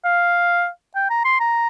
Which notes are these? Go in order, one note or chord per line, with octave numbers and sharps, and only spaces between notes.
F5
G5
A#5
C6
A#5